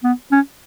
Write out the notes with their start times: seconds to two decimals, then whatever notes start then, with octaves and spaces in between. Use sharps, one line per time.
0.04 B3
0.32 C#4